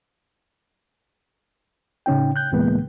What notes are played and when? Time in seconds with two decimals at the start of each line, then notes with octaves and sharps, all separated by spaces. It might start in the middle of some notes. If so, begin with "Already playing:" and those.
2.06 A2 C#3 C#4 D#4 G5
2.36 F#6 G6
2.52 C#2 A2 E3 G#3 A#3 B3